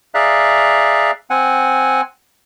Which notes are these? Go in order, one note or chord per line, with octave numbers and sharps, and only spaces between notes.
G#4 D5 E5 F5 A#5 F#6
C4 F#5 G#5